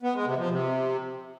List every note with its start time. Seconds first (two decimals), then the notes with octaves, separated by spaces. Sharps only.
0.03 B3
0.14 G#3
0.26 C3
0.38 F3
0.50 C3